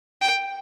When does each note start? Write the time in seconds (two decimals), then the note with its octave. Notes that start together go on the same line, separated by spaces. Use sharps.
0.21 G5